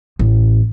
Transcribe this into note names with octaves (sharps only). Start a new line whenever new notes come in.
A1